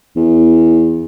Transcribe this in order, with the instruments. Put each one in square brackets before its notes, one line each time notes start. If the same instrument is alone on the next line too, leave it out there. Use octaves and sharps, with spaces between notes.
[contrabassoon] E2